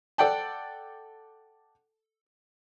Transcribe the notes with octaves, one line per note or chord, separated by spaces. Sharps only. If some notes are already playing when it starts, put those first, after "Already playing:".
A4 D5 F#5 G5 A5